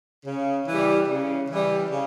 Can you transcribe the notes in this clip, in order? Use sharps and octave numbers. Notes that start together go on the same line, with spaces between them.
C#3
E3 G3
C#3
E3 G3
C#3